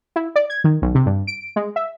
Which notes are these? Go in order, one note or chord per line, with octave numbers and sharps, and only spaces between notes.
E4
D5
G#6
D#3
B1
C3
G2
D7
G#3
E5